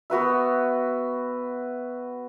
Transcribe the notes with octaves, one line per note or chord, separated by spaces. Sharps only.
B3 F#4 B4 E5